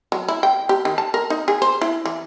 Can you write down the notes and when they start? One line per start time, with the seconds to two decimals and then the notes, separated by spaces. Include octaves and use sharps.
0.12 F#3
0.28 E4
0.43 G5
0.69 G4
0.85 D#3
0.98 A5
1.14 A#4
1.30 D#4
1.48 G#4
1.62 C5
1.81 E4
2.05 E3